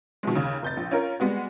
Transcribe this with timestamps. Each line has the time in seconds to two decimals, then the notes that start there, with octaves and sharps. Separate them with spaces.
0.23 B2 D#3 F3 G#3
0.35 D#2 C#3
0.62 F1 G6 A6
0.77 A#1
0.91 C#4 F4 A#4
1.20 G3 G#3 B3 F#4